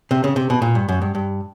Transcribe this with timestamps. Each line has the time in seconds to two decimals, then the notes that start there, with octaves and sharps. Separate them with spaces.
0.11 C3
0.24 C#3
0.36 C3
0.50 B2
0.62 A#2
0.75 G2
0.89 F#2
1.02 G2
1.15 G2